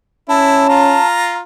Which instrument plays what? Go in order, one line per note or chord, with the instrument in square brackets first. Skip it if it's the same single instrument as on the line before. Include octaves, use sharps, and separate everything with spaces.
[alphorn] C#4 [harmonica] E4 [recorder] A5
[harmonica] F4 A#5